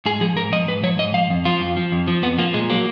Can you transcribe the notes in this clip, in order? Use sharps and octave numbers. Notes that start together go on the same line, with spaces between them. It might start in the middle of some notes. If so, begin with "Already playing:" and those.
G#2 G#4
F3 G#4
G#2 A#4
F3 D#5
G#2 B4
F3 C#5
G#2 D#5
F3 F5
F2
F3 F4
F2
F3
F2
F3
F2 B3
F3 A#3
A#2 G#3
F#3 A#3